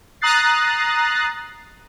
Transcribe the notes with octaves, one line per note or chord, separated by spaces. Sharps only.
A#5 D#6 F#6 A6 C7